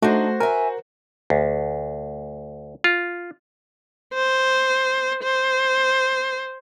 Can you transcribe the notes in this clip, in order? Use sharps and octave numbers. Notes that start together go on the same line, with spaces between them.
A3 D4 D#4 F#4 C5
A#4 E5 G#5
D2
F4
C5
C5